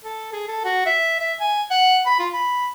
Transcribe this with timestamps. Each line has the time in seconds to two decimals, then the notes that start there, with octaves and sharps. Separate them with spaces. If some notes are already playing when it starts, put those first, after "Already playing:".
0.04 A4
0.33 G#4
0.48 A4
0.65 F#4
0.86 E5
1.20 E5
1.40 G#5
1.71 F#5
2.06 B5
2.19 F4
2.33 B5